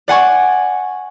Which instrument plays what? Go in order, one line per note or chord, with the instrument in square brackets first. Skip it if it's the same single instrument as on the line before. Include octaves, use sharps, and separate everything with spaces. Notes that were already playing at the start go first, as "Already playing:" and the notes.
[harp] D5 F#5 G#5 C#6